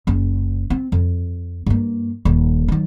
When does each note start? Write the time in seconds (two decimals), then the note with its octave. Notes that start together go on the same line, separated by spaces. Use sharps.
0.07 F#1 C#4
0.70 C4
0.92 F2
1.66 G2 A#3
2.25 D#1 D#3
2.68 D#3 F#3